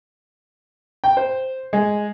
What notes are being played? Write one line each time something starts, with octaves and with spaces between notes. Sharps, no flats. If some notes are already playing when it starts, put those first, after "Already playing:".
G5
C5
G#3